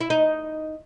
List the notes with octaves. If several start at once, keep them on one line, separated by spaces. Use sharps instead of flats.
E4
D#4